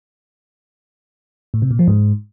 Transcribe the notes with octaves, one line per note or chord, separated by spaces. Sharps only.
A2
C3
A#2
F3
G#2